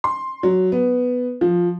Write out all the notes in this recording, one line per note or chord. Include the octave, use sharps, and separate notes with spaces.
C6
F#3
B3
F3